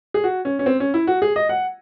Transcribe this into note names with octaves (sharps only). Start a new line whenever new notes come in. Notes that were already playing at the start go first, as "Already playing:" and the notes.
G#4
F#4
C#4
C#4
C4
C#4
E4
F#4
G#4
D#5
F#5